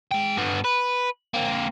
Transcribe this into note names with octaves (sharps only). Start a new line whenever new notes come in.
G#3 G5
G2 B3
B4
A#3 C4